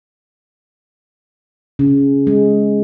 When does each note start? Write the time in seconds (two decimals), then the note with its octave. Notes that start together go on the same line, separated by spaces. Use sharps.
1.79 C#3
2.27 G#3